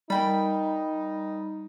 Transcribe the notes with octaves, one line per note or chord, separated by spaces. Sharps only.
G3 D#4 A#4 G5 B5